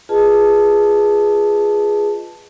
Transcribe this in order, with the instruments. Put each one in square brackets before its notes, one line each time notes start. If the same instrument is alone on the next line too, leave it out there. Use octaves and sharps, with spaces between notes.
[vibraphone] F4 G#4 B4 D#5 A5